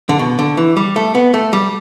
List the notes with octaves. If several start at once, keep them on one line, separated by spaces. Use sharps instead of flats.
D3
B2
D3
E3
G3
A3
B3
A3
G3